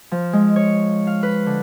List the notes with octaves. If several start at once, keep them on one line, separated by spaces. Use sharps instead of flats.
F3
G#3
C#5
F5
B4
D3